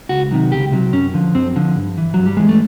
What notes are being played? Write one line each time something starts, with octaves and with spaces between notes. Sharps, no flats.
C#2 F#4
C3 D#3 F#3
C#2 G4
C3 D#3 F#3
F#2 C#4
D3 F3
F#2 C4
D3 F3
G2
E3
G2 F#3
G3
E3 G#3
A3